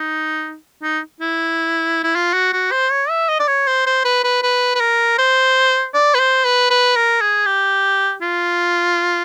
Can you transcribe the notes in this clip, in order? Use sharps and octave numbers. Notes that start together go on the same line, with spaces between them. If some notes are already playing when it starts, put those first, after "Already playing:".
Already playing: D#4
D#4
E4
E4
F4
F#4
F#4
C5
C#5
E5
D#5
D5
C#5
C5
C5
B4
B4
B4
B4
A#4
C5
D5
B4
C5
B4
B4
A#4
G#4
G4
F4